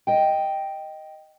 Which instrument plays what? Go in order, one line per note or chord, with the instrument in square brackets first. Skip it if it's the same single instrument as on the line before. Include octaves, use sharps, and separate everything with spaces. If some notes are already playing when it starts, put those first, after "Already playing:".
[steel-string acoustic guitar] D#5 G5